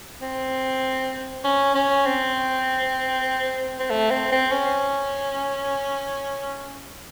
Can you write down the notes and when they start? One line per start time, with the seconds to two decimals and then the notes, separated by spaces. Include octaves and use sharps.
0.22 C4
1.44 C#4
1.75 C#4
2.06 C4
3.79 C4
3.90 A3
4.11 C4
4.32 C4
4.52 C#4